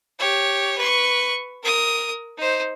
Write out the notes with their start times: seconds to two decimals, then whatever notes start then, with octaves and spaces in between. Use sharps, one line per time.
0.19 G4 C#5
0.78 B4 C#6
1.63 A#4 D#6
2.37 D#4 C5